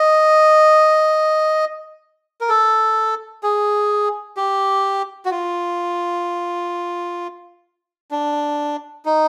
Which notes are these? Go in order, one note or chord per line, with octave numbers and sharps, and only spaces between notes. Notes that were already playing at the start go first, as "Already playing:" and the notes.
Already playing: D#5
A#4
A4
G#4
G4
F#4
F4
D4
D#4